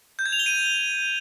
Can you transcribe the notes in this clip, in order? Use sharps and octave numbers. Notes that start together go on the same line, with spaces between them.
G6
G#6
F7
G7
D#7